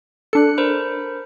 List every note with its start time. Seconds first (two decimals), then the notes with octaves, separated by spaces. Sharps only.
0.33 D4 A4 F#6 C#7
0.58 A#4 C5 B5